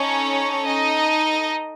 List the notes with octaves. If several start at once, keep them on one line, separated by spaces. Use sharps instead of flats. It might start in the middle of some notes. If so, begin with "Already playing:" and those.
Already playing: C#4 D#4 A4 C#5
D#4 D#5